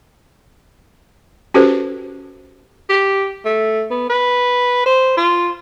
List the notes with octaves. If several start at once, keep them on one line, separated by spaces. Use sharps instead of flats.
C#4 F#4 G4 A4 B4 C5
G4
A3
B3
B4
C5
F4